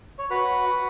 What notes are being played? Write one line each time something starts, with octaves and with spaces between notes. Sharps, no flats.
C#5
F#4 B4
F#4